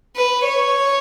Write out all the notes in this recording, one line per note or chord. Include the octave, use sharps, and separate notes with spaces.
B4
C#5